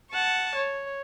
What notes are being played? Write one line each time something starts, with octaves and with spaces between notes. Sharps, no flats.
F#5 A5 C#6
C#5